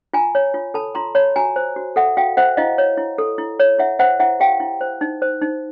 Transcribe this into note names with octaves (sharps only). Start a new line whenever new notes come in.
F4 G#5 A#5
C#5
F4
A4 A5 B5
F4 A#5 C6
C#5 A5 B5
F#4 G#5 A#5
C5
F#4
A4 E5 F#5
F#4 F5 G5
C5 E5 F#5
E4 D#5 F5
C#5
E4
A4
E4
C#5
E4 E5 F#5
C5 E5 F#5
E4 E5 F#5
G4 F5 G5
E4
C5
D#4
C5
D#4